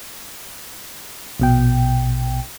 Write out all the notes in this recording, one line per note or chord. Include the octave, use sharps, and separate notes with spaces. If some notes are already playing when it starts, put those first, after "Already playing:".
A#1 B2 G5